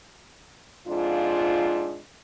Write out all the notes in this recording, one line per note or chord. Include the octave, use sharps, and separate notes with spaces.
F2 G#2 D4 F4